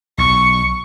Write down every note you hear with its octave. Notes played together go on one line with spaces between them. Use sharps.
B1 C#6